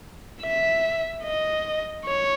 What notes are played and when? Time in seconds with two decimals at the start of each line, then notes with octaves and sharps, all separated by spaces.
0.42 E5
1.23 D#5
2.06 C#5